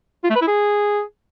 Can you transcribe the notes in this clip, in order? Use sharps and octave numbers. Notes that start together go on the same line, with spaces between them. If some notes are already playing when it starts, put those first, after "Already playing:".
F4
A3
B4
E4
G#4